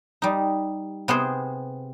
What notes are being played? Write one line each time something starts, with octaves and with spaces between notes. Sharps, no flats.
G3 D#4
C3 B3 G#4 C5